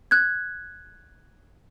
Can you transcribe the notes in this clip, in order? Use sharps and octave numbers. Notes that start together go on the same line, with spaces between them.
F#6 G#6